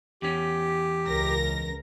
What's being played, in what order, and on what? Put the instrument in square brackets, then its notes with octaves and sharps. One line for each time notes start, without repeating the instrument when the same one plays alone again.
[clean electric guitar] E2 C#4 [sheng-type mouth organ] G4
[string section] C#2 A#4 A#6